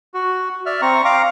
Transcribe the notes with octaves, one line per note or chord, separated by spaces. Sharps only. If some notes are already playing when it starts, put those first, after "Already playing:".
F#4
D5 E5 F6
C4 A#5 C#6
F5 A#5 D6